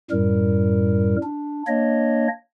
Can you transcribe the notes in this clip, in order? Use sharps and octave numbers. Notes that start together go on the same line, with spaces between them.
F#2 A2 G3 A#4
D4
A#3 D4 C#5 D#5